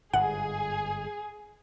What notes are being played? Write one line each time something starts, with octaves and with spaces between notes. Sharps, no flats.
G1 G#2 G#4 F#5